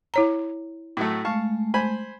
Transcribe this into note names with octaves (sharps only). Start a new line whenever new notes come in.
E4 C#5 A#5
A2 F#3 A3
G#3 A3 F5 A5 C#6
C5 G#5 B5